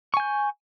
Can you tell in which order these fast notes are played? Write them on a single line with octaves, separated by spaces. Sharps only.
C#6 G#5 G6